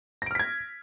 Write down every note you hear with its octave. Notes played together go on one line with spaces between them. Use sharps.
F6 G#6 A#6 B6 D7